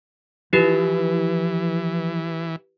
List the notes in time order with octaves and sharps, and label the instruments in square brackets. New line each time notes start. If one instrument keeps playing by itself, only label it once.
[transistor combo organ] E3 [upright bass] F3 [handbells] E4 G4 B4